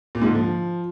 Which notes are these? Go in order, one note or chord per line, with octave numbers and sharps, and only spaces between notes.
A#2
G#2
D3
F3